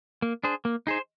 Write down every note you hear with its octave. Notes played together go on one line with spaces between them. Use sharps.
A#3
D4 G#4 C5
A#3
D#4 G#4 C5